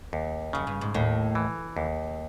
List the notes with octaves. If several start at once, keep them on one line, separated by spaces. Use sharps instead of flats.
D#2
F#2 C#3
G2
G#2
D#2 A2
E3
D#2